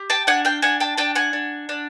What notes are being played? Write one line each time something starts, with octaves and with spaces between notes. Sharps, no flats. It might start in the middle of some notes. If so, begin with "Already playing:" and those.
Already playing: G4
G5 A5
D4 F#5 G#5
F5 G5
D4 F#5 G#5
G5 A5
D4 G5 A5
F#5 G#5
D4
D4